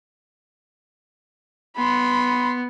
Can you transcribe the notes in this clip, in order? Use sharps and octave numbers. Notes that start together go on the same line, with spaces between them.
B3 B5 C6